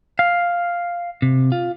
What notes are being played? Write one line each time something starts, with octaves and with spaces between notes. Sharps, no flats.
F5
C3
F4